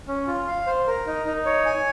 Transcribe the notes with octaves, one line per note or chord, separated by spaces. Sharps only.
C#4
F4
F5
C5
A#4
D#4
D#4
C#5
G#5